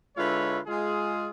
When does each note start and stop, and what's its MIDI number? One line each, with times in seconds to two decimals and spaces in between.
0.17 0.59 50
0.17 0.59 56
0.17 0.59 64
0.17 0.59 65
0.17 0.59 71
0.17 0.59 73
0.67 1.28 56
0.67 1.28 65
0.67 1.28 68